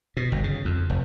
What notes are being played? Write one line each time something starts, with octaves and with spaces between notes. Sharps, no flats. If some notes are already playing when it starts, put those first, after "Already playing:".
B2
G1
C#3
F2
F1